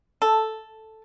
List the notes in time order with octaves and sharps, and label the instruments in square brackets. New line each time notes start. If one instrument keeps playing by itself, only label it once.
[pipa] A4